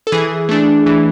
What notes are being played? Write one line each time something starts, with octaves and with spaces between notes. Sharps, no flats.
A4
E3 G#4
A3 D4
E3